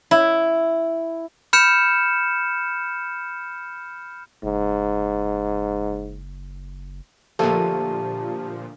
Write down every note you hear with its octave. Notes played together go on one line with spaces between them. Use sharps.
E4
B5 F6 G6 C#7 E7
F#1 G#2
A#2 D3 F3 A3 G4 E5 A5